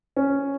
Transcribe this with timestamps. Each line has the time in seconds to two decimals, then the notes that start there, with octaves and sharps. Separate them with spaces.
0.17 C#4